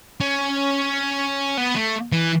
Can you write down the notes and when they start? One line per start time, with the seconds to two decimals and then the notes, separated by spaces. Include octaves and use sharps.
0.20 C#4
1.57 B3
1.76 A3
2.12 E3